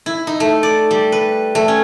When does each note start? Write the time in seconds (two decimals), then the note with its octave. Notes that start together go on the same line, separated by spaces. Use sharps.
0.06 E4
0.27 D#4
0.40 A3
0.63 D5
0.91 G3
1.12 B4
1.55 A3
1.68 C#4